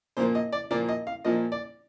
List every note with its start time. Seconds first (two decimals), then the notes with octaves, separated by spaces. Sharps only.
0.17 A#2 F3 A#3 C5
0.35 D#5
0.52 D5
0.71 A#2 F3 A#3 D5
0.89 D#5
1.07 F5
1.25 A#2 F3 A#3 D#5
1.52 D5